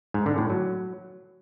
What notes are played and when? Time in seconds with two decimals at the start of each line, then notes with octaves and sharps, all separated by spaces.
0.14 G#2
0.26 D3
0.38 A2
0.50 F#3